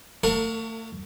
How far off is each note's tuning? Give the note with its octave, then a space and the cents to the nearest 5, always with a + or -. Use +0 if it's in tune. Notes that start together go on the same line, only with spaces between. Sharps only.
A3 +30 A#4 -45 F5 +45